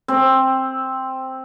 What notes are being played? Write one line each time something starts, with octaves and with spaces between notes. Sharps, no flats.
C4